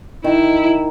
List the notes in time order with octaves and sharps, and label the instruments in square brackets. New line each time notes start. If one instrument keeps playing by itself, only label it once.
[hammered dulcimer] D#3 [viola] E4